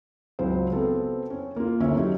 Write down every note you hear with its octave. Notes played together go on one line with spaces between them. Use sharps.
C#2 F#3 C4 C5
B3 C4 A4
C#4
A#3 F4
D2 C#4 E5
F#3 C#4 D#4 G4